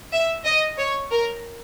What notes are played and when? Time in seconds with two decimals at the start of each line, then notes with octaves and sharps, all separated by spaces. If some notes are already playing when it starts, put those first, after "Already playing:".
0.12 E5
0.45 D#5
0.78 C#5
1.10 A#4